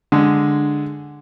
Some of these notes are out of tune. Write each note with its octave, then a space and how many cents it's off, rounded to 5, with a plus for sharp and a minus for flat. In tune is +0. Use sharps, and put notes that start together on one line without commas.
D3 +0 G#3 +0